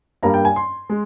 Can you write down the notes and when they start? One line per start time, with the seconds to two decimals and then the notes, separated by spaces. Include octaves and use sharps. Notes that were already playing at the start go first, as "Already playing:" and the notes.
0.23 G2 G3 A#3 A#5
0.34 G5
0.45 G#5
0.56 C6
0.90 G#3